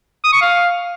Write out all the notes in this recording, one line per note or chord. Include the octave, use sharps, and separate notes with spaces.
D#6
C#6
F5